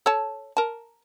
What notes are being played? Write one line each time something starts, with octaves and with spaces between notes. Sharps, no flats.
A4 C#5 A5
A#4 A5